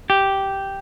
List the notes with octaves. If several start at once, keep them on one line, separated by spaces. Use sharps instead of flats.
G4